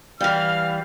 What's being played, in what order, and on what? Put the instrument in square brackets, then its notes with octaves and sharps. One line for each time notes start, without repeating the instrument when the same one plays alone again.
[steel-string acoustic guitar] E3 G3 [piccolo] F5 [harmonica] F6